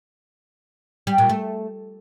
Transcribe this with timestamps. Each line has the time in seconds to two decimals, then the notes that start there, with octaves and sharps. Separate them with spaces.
1.07 G3
1.18 A#2
1.29 A3